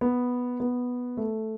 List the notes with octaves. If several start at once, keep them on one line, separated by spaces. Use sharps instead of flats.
B3
B3
A3